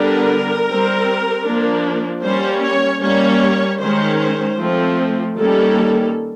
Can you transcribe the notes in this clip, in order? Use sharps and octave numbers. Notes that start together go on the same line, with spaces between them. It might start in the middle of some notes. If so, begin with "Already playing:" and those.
Already playing: D3 G3 B3 D4 A#4
G3 C4
F3 A#3 D4
G3 A#3 C#4 C5
C#5
G3 A#3 C#4 C#5
D#3 G#3 C#4 C5
C5
F3 A3 C4
D#3 G3 A#3 C#4 A4